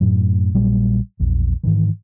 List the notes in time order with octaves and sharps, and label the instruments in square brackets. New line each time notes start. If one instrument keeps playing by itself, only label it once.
[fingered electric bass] F#2 A2 F#3
A#1 A#2 F#3 G3
A#1 E2
G#2 D#3 E3